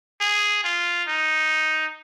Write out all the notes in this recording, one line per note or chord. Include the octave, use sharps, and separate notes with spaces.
G#4
F4
D#4